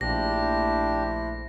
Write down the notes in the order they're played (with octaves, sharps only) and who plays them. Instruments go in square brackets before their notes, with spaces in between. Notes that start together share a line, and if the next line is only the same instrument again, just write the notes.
[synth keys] A#1 [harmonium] A3 E4 C5 [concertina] D4 G4 [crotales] A#6